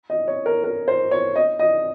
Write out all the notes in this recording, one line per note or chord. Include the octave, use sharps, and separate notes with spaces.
D#5
C#5
A#4
A#4
C5
C#5
D#5
D#5